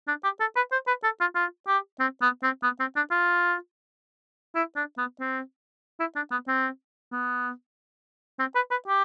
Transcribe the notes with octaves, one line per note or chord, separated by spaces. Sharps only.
D4
G4
A4
B4
C5
B4
A4
F4
F4
G4
C4
B3
C4
B3
C4
D4
F4
E4
D4
B3
C4
E4
D4
B3
C4
B3
C4
B4
B4
G4